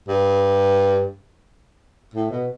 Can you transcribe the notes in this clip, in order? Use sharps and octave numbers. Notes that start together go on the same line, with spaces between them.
G2
A2
B2